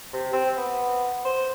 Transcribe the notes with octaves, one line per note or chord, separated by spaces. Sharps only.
C3
C4
B3
C5